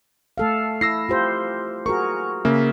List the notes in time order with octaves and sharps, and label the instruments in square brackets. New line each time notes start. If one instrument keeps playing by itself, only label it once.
[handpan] A3 A4 F5
[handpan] E4 [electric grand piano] E6 A#6 C7
[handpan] F4 G4 C5
[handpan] F#4 G#4 A#4 [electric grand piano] C#6
[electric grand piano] C#3 A#3 [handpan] E5